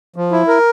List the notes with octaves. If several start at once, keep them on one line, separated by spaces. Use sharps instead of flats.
F3
E4
A#4